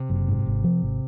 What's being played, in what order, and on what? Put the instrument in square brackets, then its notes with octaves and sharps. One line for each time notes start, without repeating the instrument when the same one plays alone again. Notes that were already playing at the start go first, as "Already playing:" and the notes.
Already playing: [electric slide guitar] C3
[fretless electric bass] F#1
G#2
G#1
F3
G#1